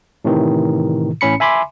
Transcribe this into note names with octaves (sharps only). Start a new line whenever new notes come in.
A2 C3 D#3 E3
A1 A2 C#4 B5 C#7
E5 G#5 B5 C6 D6